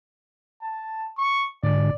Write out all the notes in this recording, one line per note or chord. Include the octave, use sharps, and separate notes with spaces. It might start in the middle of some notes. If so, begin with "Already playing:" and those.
A5
C#6
G#2 D3 D5